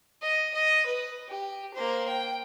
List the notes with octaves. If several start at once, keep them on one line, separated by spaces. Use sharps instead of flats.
D#5
D#5
B4
G4
A#3 C5
G5